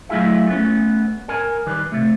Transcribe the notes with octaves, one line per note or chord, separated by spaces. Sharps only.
F#3 A3 E4 F4 G#4 E5
A3 B3 C#4
A#4 G#5
D#3 G3 B4
C3 A3